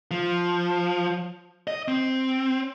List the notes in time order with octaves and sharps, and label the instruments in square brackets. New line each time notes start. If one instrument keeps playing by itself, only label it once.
[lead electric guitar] F3
D#5
C4